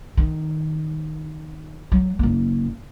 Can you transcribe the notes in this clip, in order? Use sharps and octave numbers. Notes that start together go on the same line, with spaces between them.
D#3
F#3
F#1 A#3